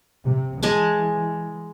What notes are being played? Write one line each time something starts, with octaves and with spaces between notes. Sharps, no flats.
C3
E3 G#3 G#5 A5